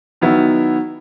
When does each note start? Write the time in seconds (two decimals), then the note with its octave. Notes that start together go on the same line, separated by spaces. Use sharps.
0.21 D#3 F#3 B3 E4